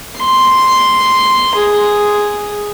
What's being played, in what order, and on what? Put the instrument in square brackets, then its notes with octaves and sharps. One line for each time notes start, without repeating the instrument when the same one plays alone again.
[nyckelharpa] C6
G#4